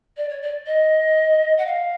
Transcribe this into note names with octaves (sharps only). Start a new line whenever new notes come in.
D5
C#5
D5
D#5
F#5
F5